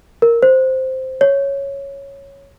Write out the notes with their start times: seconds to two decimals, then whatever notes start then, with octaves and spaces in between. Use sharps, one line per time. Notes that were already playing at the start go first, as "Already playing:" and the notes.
0.22 A#4
0.42 C5
1.21 C#5